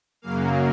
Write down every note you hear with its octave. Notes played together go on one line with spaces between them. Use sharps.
F#2 C#3 F#3 A#3 F5